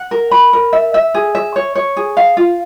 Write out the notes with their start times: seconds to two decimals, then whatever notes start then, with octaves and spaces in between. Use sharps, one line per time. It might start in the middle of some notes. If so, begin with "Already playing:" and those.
Already playing: F#5
0.11 A#4
0.31 B5
0.53 A#4
0.73 E5
0.94 E5
1.14 G#4
1.35 E5
1.56 C#5
1.75 C#5
1.97 G#4
2.17 F5
2.37 F4